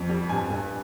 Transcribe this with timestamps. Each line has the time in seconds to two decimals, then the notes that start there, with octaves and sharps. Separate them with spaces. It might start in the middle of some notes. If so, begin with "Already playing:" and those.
Already playing: F2
0.09 G3
0.29 G2 G#5
0.50 G2